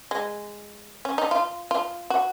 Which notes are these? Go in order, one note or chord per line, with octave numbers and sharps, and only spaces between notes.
G#3
C#4
D#4
F4
F4
F#4